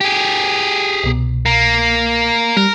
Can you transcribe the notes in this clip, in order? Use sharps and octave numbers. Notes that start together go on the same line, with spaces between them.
G4 G#4
C2 B2
A#3
G3 A#4